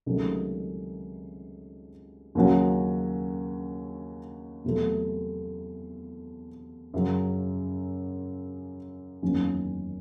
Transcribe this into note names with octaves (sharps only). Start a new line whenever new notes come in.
C#2 C3 D#3 F#3 A3
D#2 C#3 F#3 C#4 F#4
E2 C3 F#3 A3
F#2 C#3 F#3
F#1 E2 D#3 F#3 C#4